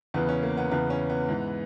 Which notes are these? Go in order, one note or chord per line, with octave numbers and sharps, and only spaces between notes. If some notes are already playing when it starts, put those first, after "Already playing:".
E2 C#3 E3 B3
C#4
A#3
B3
E2 C#3 E3 B3
C#4
B3
G#2 E3